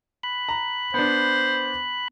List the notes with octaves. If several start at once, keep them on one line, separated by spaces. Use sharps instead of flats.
B5 F#6
A#5
B3 D4 C5